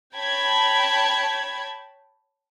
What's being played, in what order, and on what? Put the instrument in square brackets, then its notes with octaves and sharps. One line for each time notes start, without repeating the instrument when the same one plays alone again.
[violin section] C#5 G5 A5 B5 G#6